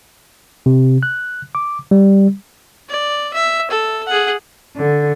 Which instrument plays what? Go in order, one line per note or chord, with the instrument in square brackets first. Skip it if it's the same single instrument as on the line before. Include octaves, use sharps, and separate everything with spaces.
[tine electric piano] C3
F#6
D6
G3
[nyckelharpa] D5
E5
A4
G#4 F#5
[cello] D3